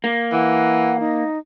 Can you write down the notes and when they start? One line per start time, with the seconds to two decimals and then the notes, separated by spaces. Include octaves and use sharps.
0.04 A#3
0.32 E3 F#5
1.00 D#4